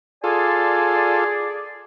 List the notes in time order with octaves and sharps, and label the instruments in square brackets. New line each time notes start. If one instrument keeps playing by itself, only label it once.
[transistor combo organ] F4 A4 [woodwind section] G#4 D5 [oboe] G#5